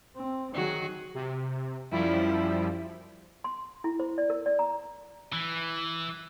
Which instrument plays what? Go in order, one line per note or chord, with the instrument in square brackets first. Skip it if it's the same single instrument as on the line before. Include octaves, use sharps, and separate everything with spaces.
[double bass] C4
[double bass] D#3 F#3 [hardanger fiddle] F#4 G#4
[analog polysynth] C3
[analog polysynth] F#2 F3 G3 [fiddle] E4
[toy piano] C6
E4
C5
D5
A#4
D5
A#5
[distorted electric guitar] E3